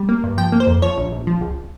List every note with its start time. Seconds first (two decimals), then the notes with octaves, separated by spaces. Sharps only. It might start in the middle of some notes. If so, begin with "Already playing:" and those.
Already playing: G3
0.09 A#3
0.23 G2
0.38 F3 G5
0.52 A#3
0.60 C5
0.67 F2
0.82 F3 C#5
0.98 A#1
1.12 A#1
1.27 F3
1.41 C#2